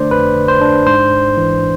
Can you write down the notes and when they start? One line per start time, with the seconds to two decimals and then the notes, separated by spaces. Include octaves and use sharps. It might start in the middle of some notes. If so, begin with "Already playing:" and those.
Already playing: D3 A3 D4 C5 D5
0.11 F2 B4
0.36 D3
0.48 C5
0.61 D4
0.87 G#2 C5
1.11 G#1
1.37 E3